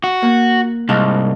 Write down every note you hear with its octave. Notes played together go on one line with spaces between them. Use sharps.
F#4
A#3 F#6
C2 G#2 F5 A5